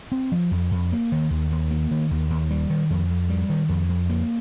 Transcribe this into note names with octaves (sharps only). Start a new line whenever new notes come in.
C4
F3
F2
F2
A#3
D#3
D#2
D#2
A#3
D#3
D#2
D#2
G3
D#3
F2
F2
G3
D#3
F2
F2
A#3